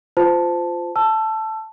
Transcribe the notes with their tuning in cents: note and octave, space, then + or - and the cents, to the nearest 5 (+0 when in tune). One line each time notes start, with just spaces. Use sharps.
F4 +0 C5 -25 A5 +0
A5 +0 E6 +25